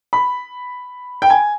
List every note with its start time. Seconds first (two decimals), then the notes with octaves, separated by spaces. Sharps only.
0.13 B5
1.22 G5
1.30 G#5